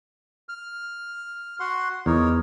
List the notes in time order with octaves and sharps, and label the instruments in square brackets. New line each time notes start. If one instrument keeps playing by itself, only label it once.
[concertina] F6
F#4 F#5 C6
[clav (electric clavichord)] E2 [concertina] D#4 A#4 C#5